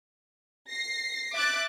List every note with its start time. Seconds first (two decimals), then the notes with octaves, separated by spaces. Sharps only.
0.69 A#6 C7
1.35 E5 D6 F#6 A6